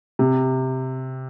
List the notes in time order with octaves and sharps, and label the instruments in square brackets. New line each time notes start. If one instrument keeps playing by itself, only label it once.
[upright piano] C3